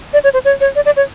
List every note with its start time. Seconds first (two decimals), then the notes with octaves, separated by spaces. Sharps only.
0.13 D5
0.24 C#5
0.34 C5
0.45 C#5
0.61 C#5
0.76 D5
0.86 D5
0.96 C#5